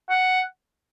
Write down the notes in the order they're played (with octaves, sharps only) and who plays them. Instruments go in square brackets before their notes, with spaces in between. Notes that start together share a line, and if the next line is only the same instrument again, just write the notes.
[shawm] F#5